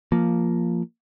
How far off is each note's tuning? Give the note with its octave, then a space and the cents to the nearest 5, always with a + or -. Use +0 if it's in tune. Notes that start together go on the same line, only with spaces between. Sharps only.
F3 -5 A#3 +0